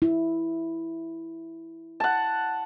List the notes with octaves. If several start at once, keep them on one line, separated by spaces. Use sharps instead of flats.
E4
F#5 A5